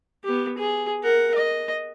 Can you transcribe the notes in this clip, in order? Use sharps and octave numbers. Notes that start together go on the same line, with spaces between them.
B3 G4
G#4
A#4 F#5
D#5